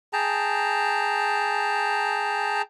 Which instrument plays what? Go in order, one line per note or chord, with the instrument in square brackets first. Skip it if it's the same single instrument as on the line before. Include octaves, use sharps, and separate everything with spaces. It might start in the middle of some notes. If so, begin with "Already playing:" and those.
[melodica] G#4 G5 A5 A#5